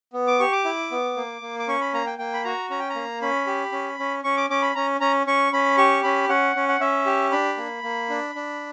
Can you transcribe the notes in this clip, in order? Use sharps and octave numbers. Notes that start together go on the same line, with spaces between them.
B3
D6
G4 C#6
D6
E4
B3
A#3
A#3
D6
C#4 C#6
B5
A#3 A#5
G5
A#3 G5
B5
F#4 A#5
C#4 A#5
G5
A#5
A#3
C#4 B5
G4
C#4
C#4
C#4 C#6
D6
C#4 D6
B5
C#4 A#5
C#4 A#5
C#4 C#6
C#4 B5
G4 C#6
C#4 B5
C#4 F#5
C#4
F#5
C#4 E5
G4
D4 B5
A#3
A#3
D4
D4